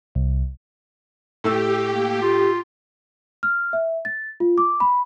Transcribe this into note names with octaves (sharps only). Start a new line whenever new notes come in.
C2
A2 A3 G4 E6
A#3
F4 G4
F6
E5
A6
F4
D6
B5